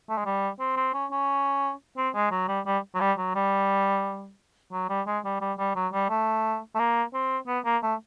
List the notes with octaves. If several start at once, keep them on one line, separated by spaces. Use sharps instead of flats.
A3
G#3
G3
C4
C4
C#4
C#4
C4
G#3
F#3
G3
G3
F#3
G3
F#3
G3
F#3
G3
G#3
G3
G3
G3
F#3
G3
A3
A3
A#3
C4
B3
A#3
A3